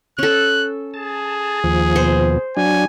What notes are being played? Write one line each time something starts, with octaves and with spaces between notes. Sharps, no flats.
C#4 A4 F#6
G#4 A5
D#2 F3
B2 C5
F#3 D4 G#5